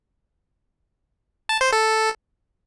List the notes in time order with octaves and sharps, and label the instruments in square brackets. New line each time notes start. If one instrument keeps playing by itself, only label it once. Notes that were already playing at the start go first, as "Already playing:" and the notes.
[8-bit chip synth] A5
C5
A4